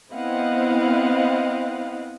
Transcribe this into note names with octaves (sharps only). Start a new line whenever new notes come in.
B3 C4 E4 D#5 F5 F#5